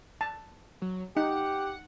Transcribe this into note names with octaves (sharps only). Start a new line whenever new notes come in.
A5
F#3
D#4 G4 F#5